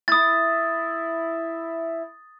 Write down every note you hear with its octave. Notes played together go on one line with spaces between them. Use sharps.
E4 D#6 A6